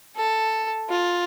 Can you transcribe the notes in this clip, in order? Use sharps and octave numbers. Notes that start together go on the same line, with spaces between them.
A4
F4